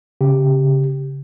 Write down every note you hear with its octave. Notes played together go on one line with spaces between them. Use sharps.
C#3 G4